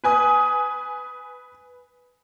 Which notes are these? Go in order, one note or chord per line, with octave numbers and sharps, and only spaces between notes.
B4 G#5 D#6